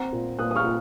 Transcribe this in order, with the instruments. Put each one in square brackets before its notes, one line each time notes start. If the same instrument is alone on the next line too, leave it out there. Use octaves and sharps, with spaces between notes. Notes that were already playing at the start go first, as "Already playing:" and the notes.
Already playing: [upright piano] C4 F#5 A#5
A#2
A#2 D#6 F#6
D#6
C#6 F6
A#2